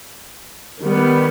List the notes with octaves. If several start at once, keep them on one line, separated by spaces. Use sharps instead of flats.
D#3 G3 B3